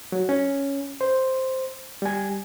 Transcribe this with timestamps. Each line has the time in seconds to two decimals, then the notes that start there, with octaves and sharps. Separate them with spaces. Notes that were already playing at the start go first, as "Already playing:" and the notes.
0.12 F#3
0.29 C#4
1.01 C5
2.02 G3 G#5